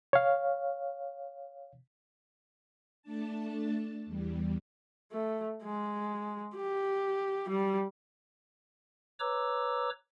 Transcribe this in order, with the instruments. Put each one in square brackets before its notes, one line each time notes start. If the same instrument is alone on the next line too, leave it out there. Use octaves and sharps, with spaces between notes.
[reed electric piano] C#5 F5
[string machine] A3 D4 A5
E2 G3
[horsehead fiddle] A3
G#3
G4
G3
[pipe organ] B4 C#5 A#5 D6 E6